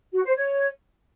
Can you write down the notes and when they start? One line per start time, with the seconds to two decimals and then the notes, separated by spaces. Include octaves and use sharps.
0.12 F#4
0.24 C5
0.36 C#5